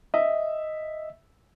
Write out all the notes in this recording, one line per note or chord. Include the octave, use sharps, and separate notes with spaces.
D#5 E5